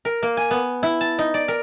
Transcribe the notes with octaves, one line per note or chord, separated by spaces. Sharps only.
A#4
A#3
G#5
B3
E4
A5
D#4
D5
A#4